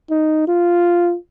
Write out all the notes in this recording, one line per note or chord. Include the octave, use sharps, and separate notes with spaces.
D#4
F4